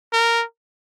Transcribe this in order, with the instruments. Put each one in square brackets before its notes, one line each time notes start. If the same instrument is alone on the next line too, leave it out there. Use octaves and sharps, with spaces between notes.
[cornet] A#4